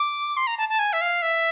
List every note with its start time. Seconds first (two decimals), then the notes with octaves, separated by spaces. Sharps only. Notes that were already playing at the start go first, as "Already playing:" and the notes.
Already playing: D6
0.37 C6
0.47 A#5
0.58 A5
0.69 A5
0.79 G#5
0.93 E5
1.01 F5
1.22 E5